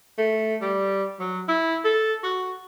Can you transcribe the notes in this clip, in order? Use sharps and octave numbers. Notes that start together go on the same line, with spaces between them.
A3
G3
F#3
E4
A4
F#4